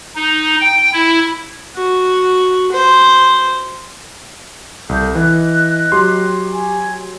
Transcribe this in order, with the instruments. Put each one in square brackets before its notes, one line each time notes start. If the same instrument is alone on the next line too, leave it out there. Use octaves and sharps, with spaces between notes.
[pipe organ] D#4
G5
E4
[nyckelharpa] F#4
C5
[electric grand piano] C2 [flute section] A4 G6
[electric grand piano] E3 [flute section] D#5 F#6
[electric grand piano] F#3 C6 [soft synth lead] G4
[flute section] G#5